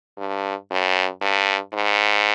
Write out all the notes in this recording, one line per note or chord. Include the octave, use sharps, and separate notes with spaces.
G2
F#2
G2
G#2